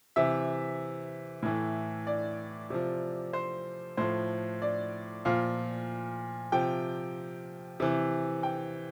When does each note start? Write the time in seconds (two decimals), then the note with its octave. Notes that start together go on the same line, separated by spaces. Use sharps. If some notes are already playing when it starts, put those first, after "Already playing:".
0.16 C3 E3 E5
1.43 A2 E3
2.07 D5
2.70 C3 F3
3.33 C5
3.97 A2 F3 C5
4.62 D5
5.25 A#2 F3 F5
6.52 C3 F3 G5
7.80 C3 E3
8.43 G5